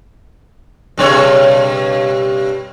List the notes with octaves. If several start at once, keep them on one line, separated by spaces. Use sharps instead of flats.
G2 B2 C#5